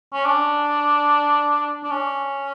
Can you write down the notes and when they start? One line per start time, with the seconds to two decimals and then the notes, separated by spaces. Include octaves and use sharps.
0.13 C#4
0.25 D4
1.83 D4
1.91 C#4